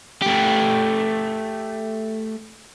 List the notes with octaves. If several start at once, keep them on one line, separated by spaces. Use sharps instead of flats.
A3 G4